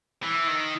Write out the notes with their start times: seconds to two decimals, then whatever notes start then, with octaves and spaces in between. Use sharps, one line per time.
0.23 E3
0.48 D#3